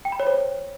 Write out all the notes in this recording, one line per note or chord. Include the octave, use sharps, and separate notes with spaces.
G5
B5
C#5
C5